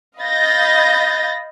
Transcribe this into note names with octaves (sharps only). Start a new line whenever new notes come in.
D#5 F5 B5 G6 A6 A#6